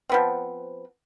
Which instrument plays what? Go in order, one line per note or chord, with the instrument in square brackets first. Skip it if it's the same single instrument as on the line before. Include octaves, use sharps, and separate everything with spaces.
[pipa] F3 B3 C4